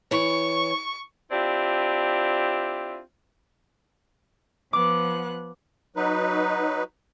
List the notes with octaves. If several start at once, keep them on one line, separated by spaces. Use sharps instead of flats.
E3 C#5 C#6
C4 D4 E4 F4 G4
F3 B3 D6 F#6
F#3 D#4 B4